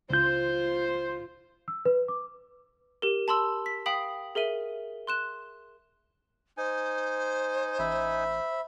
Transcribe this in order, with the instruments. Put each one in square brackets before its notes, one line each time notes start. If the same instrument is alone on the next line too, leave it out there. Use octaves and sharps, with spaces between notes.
[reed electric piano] C#2 G6 [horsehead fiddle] F4 [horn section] C5
[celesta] E6
B4
D6
[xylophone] G4 A#4
A5 B5 C6 E6
B6
F5 G5 B5 D#6 B6 F#7
G#4 A#4 E5 D#7
C6 F#6 E7
[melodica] D#4 G#5 [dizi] C5
[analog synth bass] A1 [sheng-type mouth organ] E5 B5